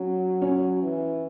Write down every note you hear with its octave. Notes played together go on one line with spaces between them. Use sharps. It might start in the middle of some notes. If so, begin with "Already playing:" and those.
Already playing: F#3 C#4
C#4
E3